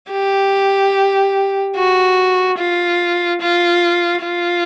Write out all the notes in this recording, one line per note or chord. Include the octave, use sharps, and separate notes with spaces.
G4
F#4
F4
F4
F4